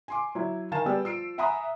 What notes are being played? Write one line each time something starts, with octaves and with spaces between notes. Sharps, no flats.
G#5 C6 D6
F#3 E4
D#3 F5 G#5 A5 A6 E7
G3 B3 G#4 D5 G5 E6
F3 E6 C7 D7
E5 F#5 G#5 A#5 B5 D#6